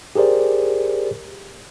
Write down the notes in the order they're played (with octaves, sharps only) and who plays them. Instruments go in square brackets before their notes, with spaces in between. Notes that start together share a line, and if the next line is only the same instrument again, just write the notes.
[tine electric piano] G4 G#4 A#4 C5 D5